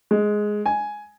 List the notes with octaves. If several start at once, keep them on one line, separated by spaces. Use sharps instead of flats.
G#3
G#5